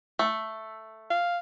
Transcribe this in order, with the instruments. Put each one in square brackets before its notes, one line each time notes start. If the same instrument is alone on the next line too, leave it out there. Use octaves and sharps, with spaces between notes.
[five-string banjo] A3
[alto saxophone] F5